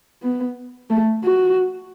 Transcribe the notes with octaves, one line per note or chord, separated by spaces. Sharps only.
B3
A3
F#4